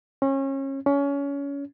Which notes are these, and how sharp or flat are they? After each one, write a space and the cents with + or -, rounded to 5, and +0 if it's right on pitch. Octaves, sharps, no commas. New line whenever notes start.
C#4 -30
C#4 +25